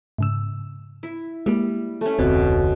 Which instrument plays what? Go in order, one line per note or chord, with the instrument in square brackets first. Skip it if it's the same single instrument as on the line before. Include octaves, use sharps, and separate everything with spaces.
[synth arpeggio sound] G#2 C#3 E6
[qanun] E4
[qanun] G3 [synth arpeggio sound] G#3 A#3
[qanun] A3 C#4
[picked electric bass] F1 D2 [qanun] B2 [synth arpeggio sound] C4